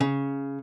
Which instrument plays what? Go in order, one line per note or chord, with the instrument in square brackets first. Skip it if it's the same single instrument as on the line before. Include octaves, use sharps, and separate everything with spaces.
[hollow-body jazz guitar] C#3